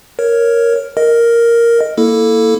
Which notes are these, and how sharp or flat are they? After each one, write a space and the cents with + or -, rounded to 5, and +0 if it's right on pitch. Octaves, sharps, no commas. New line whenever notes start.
A#4 +0 C#5 +0
A#4 +0 D#5 +0
A#3 +0 E4 +0 A4 +0